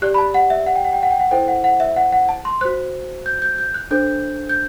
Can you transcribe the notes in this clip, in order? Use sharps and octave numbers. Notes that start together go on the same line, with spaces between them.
G4 D5 F#6
B5
A5
F#5
E5
F#5
G5
F#5
G5
F#5
G5
F#5
E4 A4 C5 G5
F#5
F#5
E5
F#5
F#5
A5
C6
F#4 C5 F#6
G6
G6
G6
F#6
D4 A4 C5 G6
G6